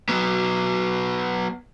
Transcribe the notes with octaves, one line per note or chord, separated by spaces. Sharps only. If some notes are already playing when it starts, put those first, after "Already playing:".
F#3 B3